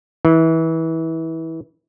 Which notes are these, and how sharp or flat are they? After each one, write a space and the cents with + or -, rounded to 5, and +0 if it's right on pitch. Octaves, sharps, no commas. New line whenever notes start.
E3 -25